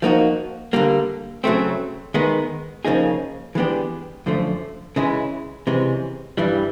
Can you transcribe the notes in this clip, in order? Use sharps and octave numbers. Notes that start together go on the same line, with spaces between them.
F3 A#3 D#4 F#4
D3 G3 A#3
C#3 F#3 A3 C4
D#3 G#3 B3 D#4
C#3 F3 A#3 D#4 G#4
E3 G#3 B3 D4 G4
F#2 D3 F3 A3
C#3 E3 G#3 C#4 E4
C3 E3 G#3 C#4
G2 E3 G3